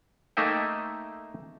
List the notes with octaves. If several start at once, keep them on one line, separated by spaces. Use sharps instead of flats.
A3 A#3 D#4 E5 G5